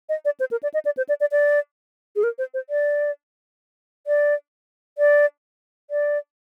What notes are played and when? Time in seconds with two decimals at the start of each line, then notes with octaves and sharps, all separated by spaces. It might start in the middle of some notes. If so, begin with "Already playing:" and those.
0.09 D#5
0.25 D5
0.40 C5
0.51 A#4
0.63 D5
0.74 D#5
0.85 D5
0.97 C5
1.09 D5
1.20 D5
1.32 D5
2.16 G#4
2.23 A#4
2.38 C5
2.54 C5
2.70 D5
4.07 D5
4.98 D5
5.90 D5